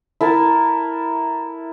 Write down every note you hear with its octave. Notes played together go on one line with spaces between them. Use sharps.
E4 A#4 A5